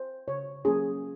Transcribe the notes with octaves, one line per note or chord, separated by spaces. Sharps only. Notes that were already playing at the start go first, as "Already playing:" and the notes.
Already playing: C5
C#3 C#5
F#3 A#3 C#4 G#4